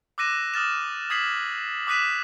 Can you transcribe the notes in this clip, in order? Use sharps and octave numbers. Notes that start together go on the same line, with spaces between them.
D6 E6 F#6 A#6 D#7 E7
D#6 F6 A6 E7
D#6 G#6 B6 C7 E7 F#7
D6 D#6 F#6 B6 D#7 E7